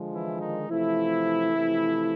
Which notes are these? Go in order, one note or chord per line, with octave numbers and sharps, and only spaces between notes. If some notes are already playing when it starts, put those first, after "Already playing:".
Already playing: D3 F3 G#3
E3 E4
D#3 D#4
C3 E3 F3 A3 E4
C3 F3 A3